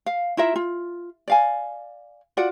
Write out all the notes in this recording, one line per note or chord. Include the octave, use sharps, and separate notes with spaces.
F5
E4 F4 A#4 E5
F4
D5 F5 G#5
F4 F#4 D5 F#5